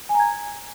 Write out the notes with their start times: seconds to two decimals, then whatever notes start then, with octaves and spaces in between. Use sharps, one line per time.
0.09 G#5
0.14 A#5
0.20 G#6